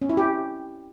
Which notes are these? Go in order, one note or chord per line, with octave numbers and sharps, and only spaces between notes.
C#4
E4
G4